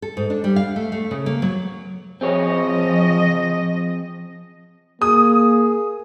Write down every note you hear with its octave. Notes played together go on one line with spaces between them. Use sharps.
A4
G#2
D4
G3
F5
A3
A3
C#3
A#3
F#3
F3 C4 G#4 C#5 D#5
A#3 G#4 D#6